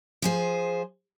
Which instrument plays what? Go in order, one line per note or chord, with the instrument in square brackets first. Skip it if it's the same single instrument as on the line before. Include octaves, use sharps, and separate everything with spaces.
[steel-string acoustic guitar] F3 G#4 C5